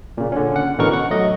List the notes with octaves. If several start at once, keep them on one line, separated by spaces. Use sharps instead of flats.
A#2 C#3
D3 C#4
F#5
A1 B2 D3 E3 A#4 C#6
F#5
F#3 A3 D#5